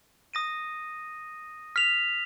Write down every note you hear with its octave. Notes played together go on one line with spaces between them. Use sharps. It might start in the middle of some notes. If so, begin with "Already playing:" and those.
D#6 A#6 D#7
F6 B6 F7